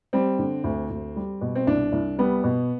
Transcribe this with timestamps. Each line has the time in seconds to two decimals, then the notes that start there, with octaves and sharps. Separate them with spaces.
0.13 G3 C4
0.39 D3
0.64 D2
0.90 D2
1.16 G3
1.41 B2
1.55 C4
1.67 C2 D4
1.92 C2
2.18 G3 B3
2.44 B2